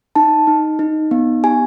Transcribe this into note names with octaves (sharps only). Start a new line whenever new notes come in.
D#4 A5
D#4
D#4
B3
G4 G#5